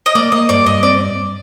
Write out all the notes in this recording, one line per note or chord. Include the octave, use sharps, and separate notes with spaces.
D#5
A#3 D5
A#3 D#5
G2 D5
G2 D#5
C4 D5